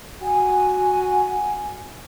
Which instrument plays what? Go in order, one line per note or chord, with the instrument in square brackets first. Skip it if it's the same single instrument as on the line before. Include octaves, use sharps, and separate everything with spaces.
[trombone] F#4 [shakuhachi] G#5